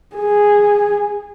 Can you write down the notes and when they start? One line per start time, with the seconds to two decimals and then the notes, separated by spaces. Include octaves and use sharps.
0.16 G#4